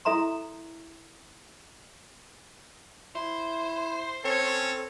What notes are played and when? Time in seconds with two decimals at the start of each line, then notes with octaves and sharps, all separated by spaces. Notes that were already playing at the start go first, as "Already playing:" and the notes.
0.05 E4 A4 E5 A#5 C6
3.15 E4 C5
4.24 C4 C#4 A4 C#5